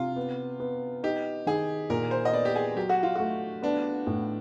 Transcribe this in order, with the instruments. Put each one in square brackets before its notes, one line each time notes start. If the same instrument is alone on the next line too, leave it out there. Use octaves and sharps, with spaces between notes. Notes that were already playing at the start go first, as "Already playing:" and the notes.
Already playing: [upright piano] C3 [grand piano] F4
[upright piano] B3
B3
[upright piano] D#4 [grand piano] G4
[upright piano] D#3 [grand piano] G#4
[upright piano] A#2 [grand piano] A#4
[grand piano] C5
D#5
[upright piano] B3 [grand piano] D5
[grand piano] G4
G#4
[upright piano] F#3 [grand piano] G4
[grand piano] F#4
F4
[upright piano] A3 [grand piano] F#4
[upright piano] B3 [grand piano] D4
[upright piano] A2